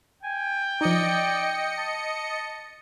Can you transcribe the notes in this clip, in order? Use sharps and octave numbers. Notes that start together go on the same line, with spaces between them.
G5 G#5
F3 D#4 D5 D#5 C#7
A5